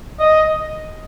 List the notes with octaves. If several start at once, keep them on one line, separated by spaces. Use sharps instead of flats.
D#5